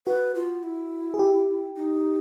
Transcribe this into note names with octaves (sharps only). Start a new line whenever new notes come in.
F#4 B4
F4
E4
G#4
G4
D#4